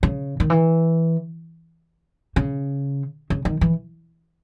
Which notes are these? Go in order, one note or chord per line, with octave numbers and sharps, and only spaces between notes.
C#3
D#3
E3
C#3
C#3
D#3
E3